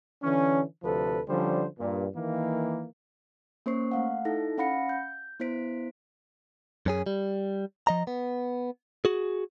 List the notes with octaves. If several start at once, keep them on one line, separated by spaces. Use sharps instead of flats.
D3 E3 C#4
D2 C3 F3 A4 B4
D3 F3 G3 C#4 C5
G2 A#2
D#3 E3 A#3
A#3 C#4 C5 C#6 C7
A3 F5 F#5
D#4 E4 A4 A#6
C#4 F5 F#5 B5 A#6 C#7
G6
B3 E4 C5 B6 D7
F#2 C#4 G#4
G3
F3 D#5 A#5
B3
F#4 G#4